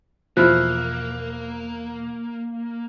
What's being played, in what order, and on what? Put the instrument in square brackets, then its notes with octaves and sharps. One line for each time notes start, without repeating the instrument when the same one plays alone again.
[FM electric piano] E2 B2 [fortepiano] F3 E4 [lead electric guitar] A#3 [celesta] F6 F#6